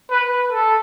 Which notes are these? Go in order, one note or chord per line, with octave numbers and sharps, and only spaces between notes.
B4
A4